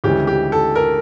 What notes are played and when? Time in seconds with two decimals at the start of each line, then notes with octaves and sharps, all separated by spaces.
0.04 D2 C#3 E3 G#3 G4
0.27 G4
0.52 A4
0.75 A#4